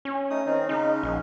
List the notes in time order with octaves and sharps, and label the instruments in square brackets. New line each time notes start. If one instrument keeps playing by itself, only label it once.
[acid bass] C#4
[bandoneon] A3 D#4 D#6
D#3 C4 D#4
[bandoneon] C#3 G#3 C#4 [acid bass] D#4
[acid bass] A#1